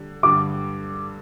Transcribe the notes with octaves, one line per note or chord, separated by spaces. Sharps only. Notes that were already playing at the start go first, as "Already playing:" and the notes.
Already playing: D3 G3
G2 D3 G3 D6